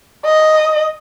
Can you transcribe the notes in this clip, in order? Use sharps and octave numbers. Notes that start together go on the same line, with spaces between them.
D#5